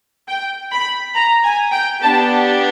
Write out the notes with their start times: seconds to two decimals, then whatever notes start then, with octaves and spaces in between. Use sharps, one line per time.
0.28 G5
0.71 B5
1.15 A#5
1.44 G#5
1.72 G5
2.02 B3 D4 G4 A5